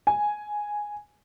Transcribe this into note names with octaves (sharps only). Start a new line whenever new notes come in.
G#5